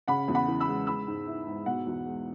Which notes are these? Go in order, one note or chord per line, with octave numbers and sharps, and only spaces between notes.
C#3 F#5 B5
E2
F#5 B5
E3
B5 E6
G#3
G#3 B5 E6
G#2
E4
G#2
B2 F#5
E2
G#3